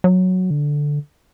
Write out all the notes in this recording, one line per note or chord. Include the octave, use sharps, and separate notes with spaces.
F#3
D3